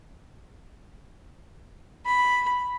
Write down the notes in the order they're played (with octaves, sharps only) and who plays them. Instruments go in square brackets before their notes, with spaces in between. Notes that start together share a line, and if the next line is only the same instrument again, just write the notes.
[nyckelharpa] B5